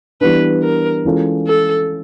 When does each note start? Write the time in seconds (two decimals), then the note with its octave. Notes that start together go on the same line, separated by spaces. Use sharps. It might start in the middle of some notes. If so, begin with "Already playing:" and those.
0.21 E3 G3 B3 D4 B4
0.63 A#4
1.05 E3 G#3 C#4 F4 A4
1.47 A4